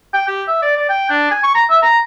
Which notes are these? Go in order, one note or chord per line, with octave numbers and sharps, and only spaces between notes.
G5
G4
E5
D5
D5
G5
D4
G#5
C#6
A#5
E5
A#5